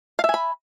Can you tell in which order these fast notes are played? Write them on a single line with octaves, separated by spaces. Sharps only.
F5 E5 G#5 B5